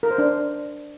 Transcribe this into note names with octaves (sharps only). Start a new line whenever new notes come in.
A#4
C5
D4